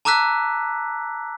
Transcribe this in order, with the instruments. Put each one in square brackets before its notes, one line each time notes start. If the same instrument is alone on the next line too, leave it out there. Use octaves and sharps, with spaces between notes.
[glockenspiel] A5 A#5 D6 E6 F#6 B6